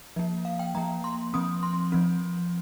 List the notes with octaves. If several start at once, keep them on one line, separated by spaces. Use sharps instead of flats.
F3 A#3
F5
G5
F3 A#3 A#5
C6
F3 C4 D#6
C6
F3 C4